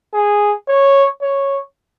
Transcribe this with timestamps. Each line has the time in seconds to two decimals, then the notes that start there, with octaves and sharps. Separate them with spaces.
0.14 G#4
0.68 C#5
1.22 C#5